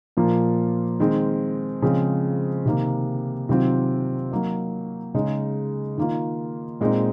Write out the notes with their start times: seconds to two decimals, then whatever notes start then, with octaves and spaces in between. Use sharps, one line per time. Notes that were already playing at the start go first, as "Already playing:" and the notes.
0.17 A#2 F3 A#3 F4
1.00 D#3 G#3 C4
1.82 C#3 F3 G#3 C4
2.65 C3 D#3 A#3
3.49 C3 D#3 F#3 C4 F4
4.31 F#3 A#3 D#4
5.14 C#3 G#3 D#4
5.98 D#3 A#3 F4
6.81 A#2 G#3 C4 D#4